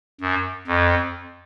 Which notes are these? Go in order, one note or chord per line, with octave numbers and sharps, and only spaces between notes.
F#2
F2